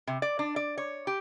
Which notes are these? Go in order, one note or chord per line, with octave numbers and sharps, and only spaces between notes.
C3
D5
D4
D5
C#5
G4